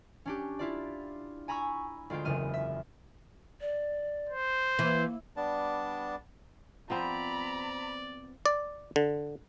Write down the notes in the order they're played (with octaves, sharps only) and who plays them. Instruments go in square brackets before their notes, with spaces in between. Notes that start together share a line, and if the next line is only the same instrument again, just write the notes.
[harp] C#4 D4 G4
E4 F4 D5
G#5 A#5 B5 C#6 E6
D2 G#3 F4 G5
F#1 E2 F6 D#7
E5
[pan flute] D5
[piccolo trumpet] C5
[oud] E3 [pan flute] A#3
[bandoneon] G3 B3 D4 A5
[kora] F3 B3 C4 [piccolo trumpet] D5 [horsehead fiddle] A#5 B5
[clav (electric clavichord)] D5
D3